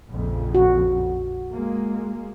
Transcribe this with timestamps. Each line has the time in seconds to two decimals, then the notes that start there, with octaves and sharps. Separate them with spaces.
0.10 A#1 F2 C#3
0.55 F#4
1.51 G#3 A#3